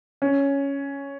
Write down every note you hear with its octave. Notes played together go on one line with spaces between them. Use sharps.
C#4